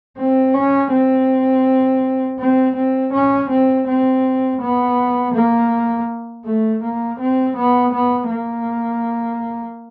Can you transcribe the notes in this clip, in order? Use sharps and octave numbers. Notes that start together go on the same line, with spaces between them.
C4
C#4
C4
C4
C4
C#4
C4
C4
B3
A#3
A3
A#3
C4
B3
B3
A#3